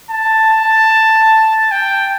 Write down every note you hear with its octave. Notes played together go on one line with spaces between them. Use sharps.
A5
A5
G5